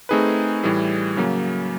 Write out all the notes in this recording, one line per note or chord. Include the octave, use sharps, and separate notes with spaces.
A3 C4 D#4 G#4 B4
A2 E3 G3
C#3 F#3 A#3